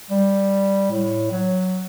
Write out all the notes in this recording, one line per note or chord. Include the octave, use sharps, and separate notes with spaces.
G3
A2
F#3